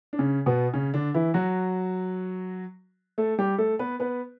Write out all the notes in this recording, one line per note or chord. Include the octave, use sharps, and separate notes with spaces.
D4
C#3 C#4
B2 B3
C#3 C#4
D3 D4
E3 E4
F#3 F#4
A3 A4
G3 G4
A3 A4
B3 B4
B3 B4